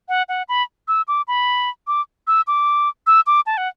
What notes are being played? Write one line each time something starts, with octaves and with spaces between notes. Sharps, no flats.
F#5
F#5
B5
E6
D6
B5
D6
E6
D6
E6
D6
A5
F#5